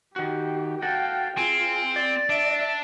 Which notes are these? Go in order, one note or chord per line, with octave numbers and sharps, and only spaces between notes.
D#3 F#4 G4
F#4 A4 F5 G5
C4 F4 G#4 G#5
D5
D4 E5